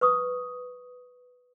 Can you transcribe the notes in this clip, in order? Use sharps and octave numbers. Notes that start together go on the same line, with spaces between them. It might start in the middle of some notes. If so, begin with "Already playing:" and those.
B4 C#6 D#6